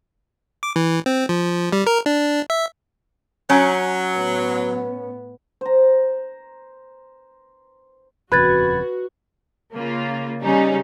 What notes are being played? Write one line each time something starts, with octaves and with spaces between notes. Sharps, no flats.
D6
E3
C4
F3
G3
A#4
D4
E5
F#3 C#4 C#5 G#5 A#5
A2 B3
C5 A#5
D#1 F2 C#3 F#4 B4 B5 G#6 A6
C#3 A#3 F4
C#3 G3 C#4 D#4